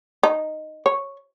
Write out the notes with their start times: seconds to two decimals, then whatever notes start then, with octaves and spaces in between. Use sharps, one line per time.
0.23 D#4
0.86 C#5